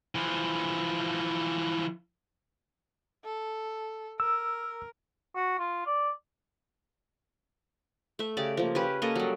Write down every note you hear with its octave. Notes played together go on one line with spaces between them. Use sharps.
E3 F3
A4
A#4 E6
F#4
F4
D5
A3 E5
C#3 G4 D5
F3 A#3
C#4 G4 B4
A#3 C#4 A4 D#5
F#3 G3